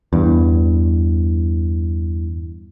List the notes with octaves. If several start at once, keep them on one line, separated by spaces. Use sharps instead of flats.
E2 G2